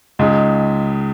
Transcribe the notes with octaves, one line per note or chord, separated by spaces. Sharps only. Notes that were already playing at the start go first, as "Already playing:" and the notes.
C#2 C#3 G#3 D#4